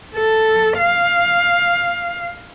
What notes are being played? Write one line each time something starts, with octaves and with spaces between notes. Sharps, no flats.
A4
F5